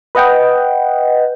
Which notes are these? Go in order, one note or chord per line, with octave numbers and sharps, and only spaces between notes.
B4 D#5 F#5 G5